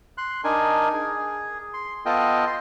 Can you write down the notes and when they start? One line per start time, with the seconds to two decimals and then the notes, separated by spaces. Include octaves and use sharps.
0.18 C6 F#6
0.44 D4 D#4 A#4 G#5
0.93 G#4
1.73 C6
2.06 B3 F4 A4 D#5 G5
2.47 C6